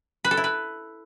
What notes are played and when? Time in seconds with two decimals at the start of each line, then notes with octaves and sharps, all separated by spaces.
0.25 B4
0.31 A4
0.37 E4
0.44 B4